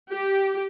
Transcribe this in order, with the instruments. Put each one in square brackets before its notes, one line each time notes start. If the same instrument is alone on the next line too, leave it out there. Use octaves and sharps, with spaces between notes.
[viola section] G4